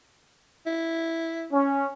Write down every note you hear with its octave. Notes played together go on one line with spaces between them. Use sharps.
E4
C#4